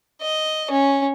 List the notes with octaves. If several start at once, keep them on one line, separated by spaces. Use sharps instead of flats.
D#5
C#4